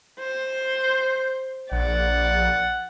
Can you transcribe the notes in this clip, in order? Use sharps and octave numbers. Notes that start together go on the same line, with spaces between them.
C5
A#1 D5 F#5